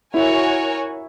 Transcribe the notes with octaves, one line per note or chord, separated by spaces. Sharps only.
E4 F#4 A#4 C#5 G#5